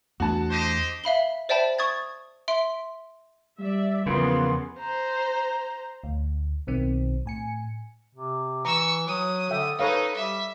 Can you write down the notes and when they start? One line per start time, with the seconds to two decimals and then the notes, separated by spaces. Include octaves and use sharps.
0.20 E2 A3 D4 F#4 A5
0.50 G4 C5 D#5
1.04 E5 F5 B5 G7
1.49 C5 D5 E5 G5 A5 B5
1.79 C#6 D#6 G#6 A6
2.48 E5 C6 D7
3.59 G3 D5 E5
4.06 E2 C#3 F3 A#3 B3 C6
4.79 C5 A#5
6.04 D2
6.67 B1 D#3 C4
7.26 A2 G#5 C#7
8.15 C3
8.65 E3 A#5 C#6 E6
9.07 F#3 D#6
9.51 D3 E5 G5
9.79 D#4 A4 B4 C#5 F5
10.15 G3 E5